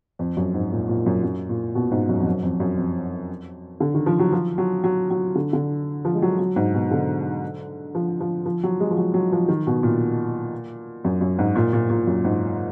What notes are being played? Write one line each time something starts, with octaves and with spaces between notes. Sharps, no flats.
F2
F#2
G#2
A#2
A#2
F#2
F#2
A#2
B2
G#2
F#2
F2
F#2
F2
F#2
F2
D3
D#3
F3
F#3
F3
F#3
F#3
F#3
D3
D3
F3
G#3
F#3
F#3
G#2
B2
D3
F3
F3
F3
F#3
G#3
F3
F#3
F#3
F3
D#3
B2
A#2
F#2
F#2
G#2
A#2
A#2
A#2
F#2
G#2